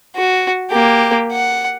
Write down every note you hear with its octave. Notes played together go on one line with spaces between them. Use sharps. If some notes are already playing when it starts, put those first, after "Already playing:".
F#4
A#3 G4
F#5